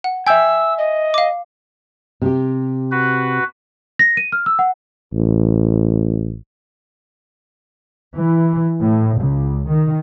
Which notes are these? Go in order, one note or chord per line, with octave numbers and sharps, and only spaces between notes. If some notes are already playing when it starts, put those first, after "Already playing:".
F#5
E5 G5 G#5 E6 G6
D#5
F5 D6
C3 G4
F#4 B4
A#6
D#7
F6
E6
F#5
A1
E3
A2
C#2
D#3